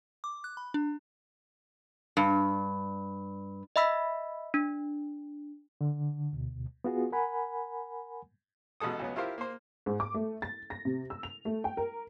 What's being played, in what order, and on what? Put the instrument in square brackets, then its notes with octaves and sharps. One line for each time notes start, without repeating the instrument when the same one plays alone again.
[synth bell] D6
F#6
B5
D4
[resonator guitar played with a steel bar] G2
[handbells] D#5 E5 B5 E6 B6
D4
[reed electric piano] D3
D2 B2
B3 F4 F#4 G#4
A#4 F#5 G#5 B5
[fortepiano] A1 B2 G#3 A4 D#6
C#2 F#3 B3
E4 F4 G4 A#4 C5 F5
A#3 C5
[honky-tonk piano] G#2
D6
A3
A6
A#6
C3
E6
F7
A3
G5
A#4